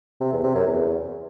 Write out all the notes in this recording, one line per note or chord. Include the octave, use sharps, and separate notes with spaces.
C3
E2
C3
F#2
E2